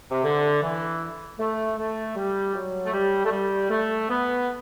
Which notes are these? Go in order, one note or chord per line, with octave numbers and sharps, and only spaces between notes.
C3
D3
E3
A3
A3
G3
F#3
A3
G3
A3
G3
A3
B3